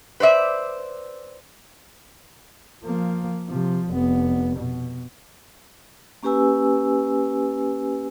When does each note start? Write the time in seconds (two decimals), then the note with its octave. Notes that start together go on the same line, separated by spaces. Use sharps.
0.20 B4 C5 D5 E5
2.84 F3 A#3
3.48 C3 F3
3.88 F1 B3
4.57 B2
6.23 A#3 C#4 G4 B4 G#5 E6